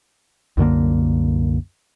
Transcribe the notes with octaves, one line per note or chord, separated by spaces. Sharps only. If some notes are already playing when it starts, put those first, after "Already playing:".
C2 F#2 D3 A#3